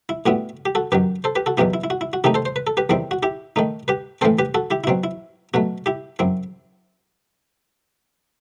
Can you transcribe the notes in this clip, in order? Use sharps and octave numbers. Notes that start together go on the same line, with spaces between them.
E4
A2 G3 B3 E4 F#4
G4
F#4 A4
F#2 D#3 F#3 G4 B4
A4 C5
G4 B4
F#4 A4
E2 B2 F#3 B3 E4 G4
E4
E4
F#4
E4
F#4
C3 D#3 A3 D#4 E4 G4
A4 C5
C5
B4
A4
G4 B4
E2 D#3 G3 C4 E4
F#4
E4 G4
D#3 A3 D#4
G4 B4
A2 E3 A3 C4 A4 C5
G4 B4
F#4 A4
E4 G4
E4
B2 F#3 C4 F#4
E4
B2 F#3 A3 F#4
E4 G4
F#2 F#3 C4 E4